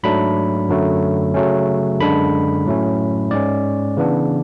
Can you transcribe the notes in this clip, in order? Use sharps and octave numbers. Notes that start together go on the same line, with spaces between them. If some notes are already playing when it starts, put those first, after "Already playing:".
G#2 F#3 A3 D4 B5
F#2 D3 F#3 A3
C#3 F#3 A3 C#4
F#2 D3 G#3 D4 B5
A2 F#3 A3 C#4
G#2 G#3 C#4 D5
C#3 E3 B3 D4